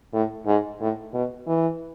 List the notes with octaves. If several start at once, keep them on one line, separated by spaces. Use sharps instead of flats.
A2
G#2
A2
B2
E3